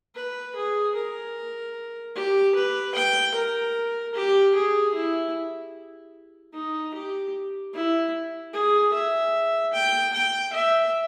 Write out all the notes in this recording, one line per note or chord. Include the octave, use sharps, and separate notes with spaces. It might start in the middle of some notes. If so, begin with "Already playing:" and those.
B4
G#4
A#4
G4
B4
G5
A#4
G4
G#4
E4
D#4
G4
E4
G#4
E5
G5
G5
E5